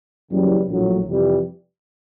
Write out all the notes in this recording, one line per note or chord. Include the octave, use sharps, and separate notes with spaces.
F#1 F#2 C#3 E3 G3
A#1 A2 F#3
F2 C3 E3 G3